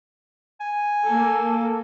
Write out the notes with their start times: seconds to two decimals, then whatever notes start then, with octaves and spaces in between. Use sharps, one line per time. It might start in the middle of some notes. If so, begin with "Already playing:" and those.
0.61 G#5
1.07 A#3 A4